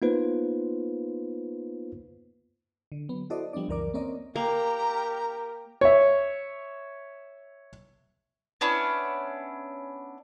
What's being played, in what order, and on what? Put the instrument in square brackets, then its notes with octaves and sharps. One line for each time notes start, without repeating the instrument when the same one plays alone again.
[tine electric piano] A#3 B3 D#4 F4 B4 C5
[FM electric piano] D3
F#3 B3
E4 F#4 A4 C5 D5 D#5
F3 G3 B3 D4 D5
C#2 F#2 E3 A#4 D5 D6
A#3 C4 C#4 A#4 D5 D#5
[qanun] A#3 [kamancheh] G4 A#4 [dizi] A#5
[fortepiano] C#5 E5
[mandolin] B3 C#4 D4 E4